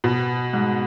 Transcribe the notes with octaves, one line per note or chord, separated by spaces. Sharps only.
B2
G#2